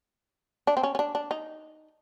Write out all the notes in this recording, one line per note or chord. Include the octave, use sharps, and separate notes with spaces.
D4
C4
C#4
C#4
D4
D4
D#4